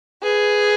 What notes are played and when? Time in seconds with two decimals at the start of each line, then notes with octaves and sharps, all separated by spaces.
0.23 G#4 B4